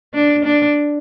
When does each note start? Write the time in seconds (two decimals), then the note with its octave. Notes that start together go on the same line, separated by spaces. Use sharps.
0.14 D4
0.44 D4